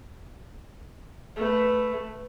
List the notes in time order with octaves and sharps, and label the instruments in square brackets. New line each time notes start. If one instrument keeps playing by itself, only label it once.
[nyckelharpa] A3 B4